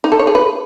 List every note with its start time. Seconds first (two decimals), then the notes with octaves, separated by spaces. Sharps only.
0.04 D#4
0.12 A4
0.19 C#5
0.27 G#4
0.35 B4